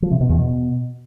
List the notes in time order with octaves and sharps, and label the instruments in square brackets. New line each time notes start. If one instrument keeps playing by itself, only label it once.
[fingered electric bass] F3
C3
B2
E2
B2